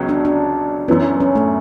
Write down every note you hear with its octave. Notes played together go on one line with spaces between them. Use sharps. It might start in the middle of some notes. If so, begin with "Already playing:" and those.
Already playing: C#2 B2 F#3 C#4
D4
D4
F#2 E3 B3 C#4
C#4
A3